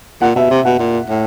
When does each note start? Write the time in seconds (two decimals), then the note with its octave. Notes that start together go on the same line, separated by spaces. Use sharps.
0.22 A#2 F#5
0.36 B2 E5
0.51 C3
0.65 B2 F#5
0.79 A#2
1.09 A2